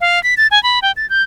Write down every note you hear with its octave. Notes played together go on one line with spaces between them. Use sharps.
F5
B6
A6
G#5
B5
G5
A6
G6